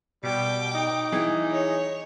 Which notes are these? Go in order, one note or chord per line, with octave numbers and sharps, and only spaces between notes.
B2 G3 G5 D6
D#4
E3 G#4
C#5